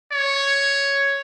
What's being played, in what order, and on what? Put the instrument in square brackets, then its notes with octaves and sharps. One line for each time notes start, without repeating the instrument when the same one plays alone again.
[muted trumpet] C#5